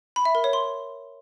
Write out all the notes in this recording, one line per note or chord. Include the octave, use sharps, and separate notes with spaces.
B5
E5
A#4
C#5
C6